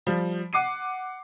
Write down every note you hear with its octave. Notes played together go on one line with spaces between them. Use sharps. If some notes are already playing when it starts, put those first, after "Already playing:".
F3 G3
F#5 D6 C7 D#7